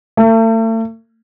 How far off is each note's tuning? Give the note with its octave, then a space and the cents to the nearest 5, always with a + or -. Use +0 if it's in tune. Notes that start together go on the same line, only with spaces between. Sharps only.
A3 +40